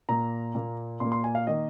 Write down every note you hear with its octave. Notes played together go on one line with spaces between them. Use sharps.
A#2 A#3 A#5
A#2 A#3
A#2 A#3 C6
C6
G#5
F5
D#3 A#3 D#5